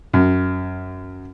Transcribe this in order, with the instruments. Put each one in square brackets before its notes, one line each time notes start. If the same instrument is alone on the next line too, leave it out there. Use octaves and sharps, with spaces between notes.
[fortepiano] F#2